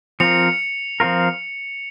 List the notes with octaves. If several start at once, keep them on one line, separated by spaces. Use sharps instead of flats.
F3 C4 F4 A#4 C#7 F7
F3 C4 F4 A#4